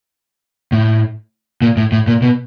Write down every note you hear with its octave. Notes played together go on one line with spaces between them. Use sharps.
A2
A#2
A2
A2
A#2
B2